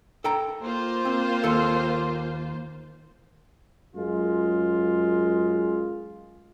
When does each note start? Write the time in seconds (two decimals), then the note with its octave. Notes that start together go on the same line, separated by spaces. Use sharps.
0.24 A4 G5 A#5
0.61 A#3 F4 C5
1.05 C4
1.44 D#2 A4
3.96 F#2 G#3 F4